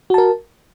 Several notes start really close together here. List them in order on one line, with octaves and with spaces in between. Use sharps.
F#4 A5 A#4